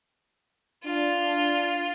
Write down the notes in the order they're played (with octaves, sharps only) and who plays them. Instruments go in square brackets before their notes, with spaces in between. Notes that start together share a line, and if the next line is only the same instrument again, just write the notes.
[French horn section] D4 [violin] F4